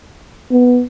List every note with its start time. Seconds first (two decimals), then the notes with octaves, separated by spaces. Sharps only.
0.51 B3